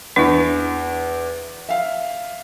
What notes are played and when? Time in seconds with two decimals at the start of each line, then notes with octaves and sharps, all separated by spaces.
0.16 E2 D4 E4
1.69 E5 F5